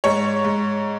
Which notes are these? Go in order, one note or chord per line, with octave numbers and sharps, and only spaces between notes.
G#2 C#5
G#2